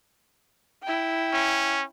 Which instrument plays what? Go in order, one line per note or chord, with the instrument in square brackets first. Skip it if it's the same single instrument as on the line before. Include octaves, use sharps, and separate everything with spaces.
[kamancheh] E4 G5
[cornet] C#4